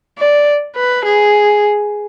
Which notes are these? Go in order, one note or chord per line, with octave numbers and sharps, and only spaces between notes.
D5
B4
G#4